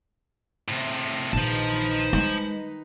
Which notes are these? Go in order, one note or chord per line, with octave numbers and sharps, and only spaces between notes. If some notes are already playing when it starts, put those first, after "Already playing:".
A2 C3
A#1 D#3 D#4 B4 C5 A5
G#3